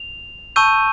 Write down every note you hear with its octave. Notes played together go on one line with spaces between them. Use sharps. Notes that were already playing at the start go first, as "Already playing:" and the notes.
Already playing: F7
A5 C#6 E6 G6 D#7